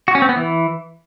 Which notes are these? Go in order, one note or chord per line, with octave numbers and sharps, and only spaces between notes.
F#4
C#4
C4
B3
E3